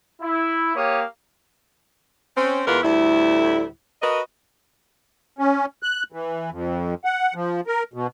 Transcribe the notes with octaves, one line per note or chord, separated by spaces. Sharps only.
E4
A#3 G4 C#5 F5 D#6
C4 C#4
E2 G#3 F4 A#4 B4 F#5
D2 A2 G3 E4
F#4 A#4 B4 D#5
C#4
F#6
E3
F2
F#5
F3
A#4
B2